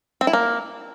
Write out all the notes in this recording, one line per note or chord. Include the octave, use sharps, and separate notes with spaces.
C4
E4
A#3